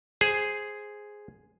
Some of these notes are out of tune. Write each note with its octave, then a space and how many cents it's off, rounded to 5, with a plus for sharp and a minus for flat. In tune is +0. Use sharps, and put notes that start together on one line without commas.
G#4 +0 C5 +0